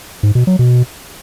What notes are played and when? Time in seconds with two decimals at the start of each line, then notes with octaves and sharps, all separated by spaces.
0.23 G#2
0.35 B2
0.47 F#3
0.59 B2